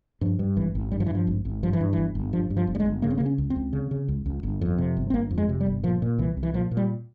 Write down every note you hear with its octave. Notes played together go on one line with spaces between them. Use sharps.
G2 F3
G2
G#1 E3
G#1
G2 G3
F3
E3
G2 F3
G#1
G#1
G2 F3
E3
G2
G1 E3
G1
G2 F3
G2
F3
G1
G3
G#3
G1
C#3 A#3
C4
C#3 A#3
C#4
C#2
C4
C#2
C#3
C#3
C#2
C#2
G1
F2
C3
G1
C4
G1 A#3
F2
G#3
C3
G3
G1
A#2 F3
A#2
C2 E3
C2
E3
A#2 F3
A#2
G3